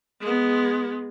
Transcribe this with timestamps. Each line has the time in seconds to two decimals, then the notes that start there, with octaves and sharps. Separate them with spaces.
0.21 G#3 B3